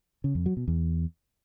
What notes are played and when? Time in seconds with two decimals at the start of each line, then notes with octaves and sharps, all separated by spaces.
0.24 C#3
0.35 F2
0.46 F#3
0.57 B2
0.68 E2